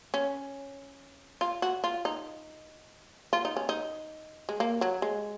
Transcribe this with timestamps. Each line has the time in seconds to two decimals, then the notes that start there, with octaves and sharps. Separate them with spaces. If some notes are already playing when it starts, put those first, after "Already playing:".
0.14 C#4
1.41 F4
1.62 F#4
1.84 F4
2.05 D#4
3.33 F4
3.45 D#4
3.56 C#4
3.69 D#4
4.49 G#3
4.60 A#3
4.81 F#3
5.02 G#3